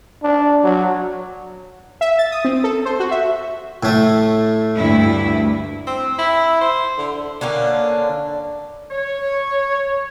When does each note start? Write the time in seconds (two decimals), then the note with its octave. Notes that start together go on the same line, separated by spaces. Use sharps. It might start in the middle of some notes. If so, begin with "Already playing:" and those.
0.23 D4
0.64 F#3
2.01 E5
2.18 A6
2.32 D#6
2.45 C4
2.64 A4
2.85 C5
3.00 F#4
3.11 E5
3.83 A2 A3
4.75 D2 G2 E4
5.87 C4
6.18 E4
6.61 C5
6.98 D3
7.41 D3 A#3 C#4 D4
8.91 C#5